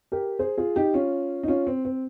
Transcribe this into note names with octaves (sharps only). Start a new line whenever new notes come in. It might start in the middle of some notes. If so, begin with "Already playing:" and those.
G4 A#4
G#4 C5
F4 G#4
D#4 G4
C#4 F4
D#4
C#4 F4
C4
C4